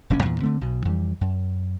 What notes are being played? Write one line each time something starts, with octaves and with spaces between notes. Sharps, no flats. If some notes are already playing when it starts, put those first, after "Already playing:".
F1 A#1 C4 C#4
E2 G2 A#2 E3
D3 A3 C4
B1 B2
F2 E3 G3
F#2